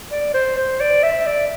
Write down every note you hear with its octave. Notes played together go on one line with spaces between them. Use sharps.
D5
C5
C5
D5
E5
D5